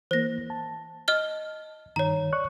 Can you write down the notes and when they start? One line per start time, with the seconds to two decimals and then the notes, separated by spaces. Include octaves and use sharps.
0.11 E3 A#3 C5 A#6
0.50 A5
1.08 D#5 F6 G7
1.96 G2 D#3 C#5 A#5
2.33 D5 C#6 F#6